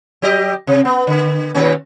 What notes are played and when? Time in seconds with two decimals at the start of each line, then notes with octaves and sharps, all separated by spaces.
0.22 F#3 G4 D#5
0.67 C3
0.85 B3
1.07 D3
1.55 D#2 B2 C#4